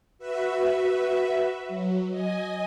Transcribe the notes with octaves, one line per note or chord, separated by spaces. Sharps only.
F#4 B4 E5
F#3
D#5 G#5